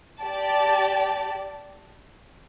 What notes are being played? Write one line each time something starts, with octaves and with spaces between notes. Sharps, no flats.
G4 D5 A5